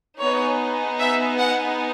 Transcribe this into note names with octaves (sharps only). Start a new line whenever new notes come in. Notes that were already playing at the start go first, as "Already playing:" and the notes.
B3 D#4 G#4 C#5
E5
F#5